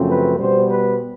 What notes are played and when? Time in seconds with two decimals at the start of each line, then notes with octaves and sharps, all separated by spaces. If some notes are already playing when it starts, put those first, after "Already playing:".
Already playing: F#2 C#3 F3 A3 C4
0.08 B4
0.38 B2 G3 B3 C5
0.68 B4